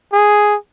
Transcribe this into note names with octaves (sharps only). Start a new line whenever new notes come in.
G#4